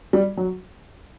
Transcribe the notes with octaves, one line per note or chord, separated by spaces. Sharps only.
G3
F#3